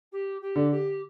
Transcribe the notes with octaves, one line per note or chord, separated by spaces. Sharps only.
G4
G4
D3
G4